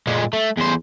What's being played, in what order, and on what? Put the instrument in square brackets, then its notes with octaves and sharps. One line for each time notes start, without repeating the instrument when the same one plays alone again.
[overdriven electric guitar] A#2 G#3
A3
E2 C5